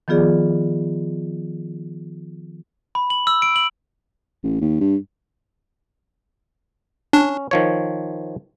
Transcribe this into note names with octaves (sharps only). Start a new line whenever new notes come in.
D#3 F3 B3 F4 G#4 D5
B5
F#7
E6
D7
F#7
A1
D#2
G2
C#4 D4
D#3 F3 C#5